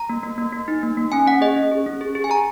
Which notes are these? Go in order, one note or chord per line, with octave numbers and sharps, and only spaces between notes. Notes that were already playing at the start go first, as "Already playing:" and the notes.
Already playing: A#5
A#3
A#3
A#3
A#3
D#4
A#3
A#3
C#4 G#5
C#4 F#5
G#4 D#5
C#4
G#4
C#4
G#4
G#4
G#5
G#4 A#5